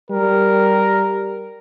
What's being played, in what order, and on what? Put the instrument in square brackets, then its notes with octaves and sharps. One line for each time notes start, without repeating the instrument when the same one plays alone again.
[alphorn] G3 [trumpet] A#4